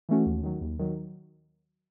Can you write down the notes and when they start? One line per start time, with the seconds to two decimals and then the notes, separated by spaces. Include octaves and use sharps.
0.09 E3 A3 C#4 F#4
0.26 D#2
0.43 D#3 F#3
0.61 D#2
0.79 D#3 F#3